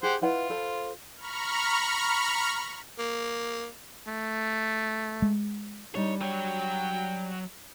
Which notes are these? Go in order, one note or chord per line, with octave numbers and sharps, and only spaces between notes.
G4 G#4 C5 F#5
E4 F4 B4 F#5
A4 C5 B5
A#5 B5 C#6 F6
A#3
A3
G#3
G3 D4 D#4 C#5
F#3 C#5 G5